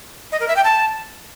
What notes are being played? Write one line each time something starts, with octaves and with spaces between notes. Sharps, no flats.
D#5
A#4
E5
G5
A5